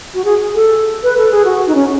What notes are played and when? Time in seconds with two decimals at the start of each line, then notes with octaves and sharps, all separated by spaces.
0.14 F#4
0.25 G#4
0.55 A4
1.03 B4
1.18 A4
1.31 G#4
1.45 F#4
1.67 D#4
1.75 C#4